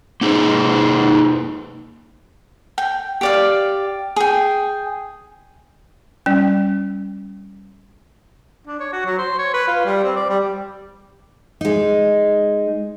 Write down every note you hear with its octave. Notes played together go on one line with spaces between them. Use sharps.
A#3 D#4 G#4 C5
G5
G4 D5 F5
G#4 G5
G3 C#4
D4
C#5
F#4
F#3
C5
C#5
B4
F4
G3
C4
D5
G3
G#3 D#4